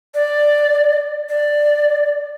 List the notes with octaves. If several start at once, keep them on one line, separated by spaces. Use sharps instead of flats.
D5
D5